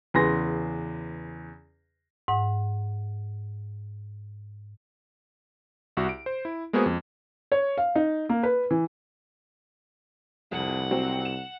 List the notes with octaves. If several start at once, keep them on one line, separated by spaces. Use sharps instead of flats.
E2 C#3 B4 G#5 C6 A#6
G#2 F#5
C2 F#4
D7
C5
E4
G#3 A#3 B3 F#4 G#4 C5
F2
C#5
F5
D#4
A#3
B4
E3
C2 F2 F#5
F#3 C4
E7